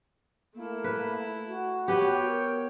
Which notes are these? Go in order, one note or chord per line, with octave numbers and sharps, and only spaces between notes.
A3 A#3 E4
B4
F#4
B3 G4 C#5 G5
A#4